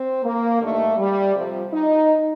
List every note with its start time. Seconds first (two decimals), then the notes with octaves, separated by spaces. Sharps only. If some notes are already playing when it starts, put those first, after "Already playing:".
Already playing: C4
0.24 A#3
0.61 G2 D#3 A3
0.98 G3
1.35 F2 C3 F3
1.73 D#4